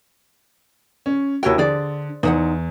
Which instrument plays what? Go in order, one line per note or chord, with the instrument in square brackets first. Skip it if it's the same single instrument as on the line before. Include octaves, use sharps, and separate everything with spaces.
[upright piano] C#4
[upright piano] D#2 F#4 [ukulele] E4 C#5 G5
[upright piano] D3 [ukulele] G#4 C5 D5
[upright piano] E2 [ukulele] D#4 C5 F#5